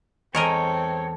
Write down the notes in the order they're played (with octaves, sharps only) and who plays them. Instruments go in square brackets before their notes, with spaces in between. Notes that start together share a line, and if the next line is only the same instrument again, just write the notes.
[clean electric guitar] E2 A4 [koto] G#3 A#4 D#5 [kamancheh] C4 [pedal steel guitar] C#5